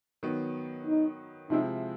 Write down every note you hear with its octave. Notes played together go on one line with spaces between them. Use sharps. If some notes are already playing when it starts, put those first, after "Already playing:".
D#3 F#3 B3
D#4
C3 F3 G#3 C4 D#4 E4